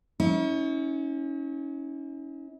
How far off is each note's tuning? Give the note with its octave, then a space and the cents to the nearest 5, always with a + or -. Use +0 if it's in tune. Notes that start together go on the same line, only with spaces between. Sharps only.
C#4 +5 E4 -45